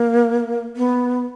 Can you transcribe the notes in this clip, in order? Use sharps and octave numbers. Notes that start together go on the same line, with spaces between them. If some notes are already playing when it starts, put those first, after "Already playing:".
Already playing: A#3
B3